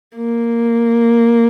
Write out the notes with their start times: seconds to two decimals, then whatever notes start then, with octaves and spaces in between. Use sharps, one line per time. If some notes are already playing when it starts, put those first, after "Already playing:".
0.16 A#3